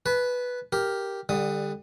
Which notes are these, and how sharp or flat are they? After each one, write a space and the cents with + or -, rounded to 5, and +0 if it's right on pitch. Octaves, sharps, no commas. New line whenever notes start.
B4 +0 A5 -40
G4 +0 A#4 +0
D3 +10 G3 +25 D#6 +0